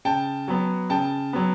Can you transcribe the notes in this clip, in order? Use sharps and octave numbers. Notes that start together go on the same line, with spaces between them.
C#3 G5 A5
F#3 B3
C#3 G5 A5
F#3 B3